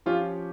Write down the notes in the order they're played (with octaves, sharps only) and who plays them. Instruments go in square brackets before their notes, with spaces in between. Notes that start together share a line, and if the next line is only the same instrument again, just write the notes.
[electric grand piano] F3 C#4 G4 C#5 [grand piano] F4